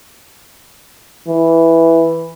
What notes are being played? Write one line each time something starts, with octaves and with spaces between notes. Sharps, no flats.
E3